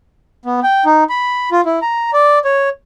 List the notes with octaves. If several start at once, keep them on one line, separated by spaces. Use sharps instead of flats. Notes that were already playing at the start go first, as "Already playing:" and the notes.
B3
G5
D#4
B5
F4
E4
A#5
D5
C#5